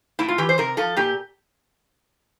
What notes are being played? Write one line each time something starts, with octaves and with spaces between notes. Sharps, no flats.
A2 E4
F4
E3 G4
C5
C3 A#4
F3 A4
A#2 G4